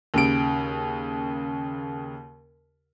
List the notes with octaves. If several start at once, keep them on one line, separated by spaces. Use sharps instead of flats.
D#2 C#3 D7